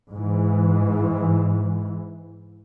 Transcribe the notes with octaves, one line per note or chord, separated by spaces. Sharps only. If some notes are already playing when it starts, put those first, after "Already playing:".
G#2 E3